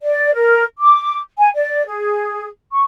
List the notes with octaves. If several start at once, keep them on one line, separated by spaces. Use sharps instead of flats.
D5
A#4
D6
G#5
D5
G#4
C#6